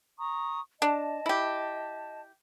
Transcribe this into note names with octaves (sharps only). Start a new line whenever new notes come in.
A#5 C#6 D#6
D4 D#5 A5
E4 G4